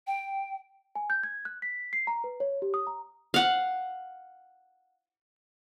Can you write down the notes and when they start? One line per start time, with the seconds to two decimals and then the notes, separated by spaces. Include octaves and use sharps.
0.07 G5
0.95 G#5
1.10 G6
1.23 G#6
1.45 F#6
1.62 B6
1.93 C7
2.07 A#5
2.24 B4
2.40 C#5
2.62 G4
2.74 D#6
2.87 A#5
3.34 F5 F#5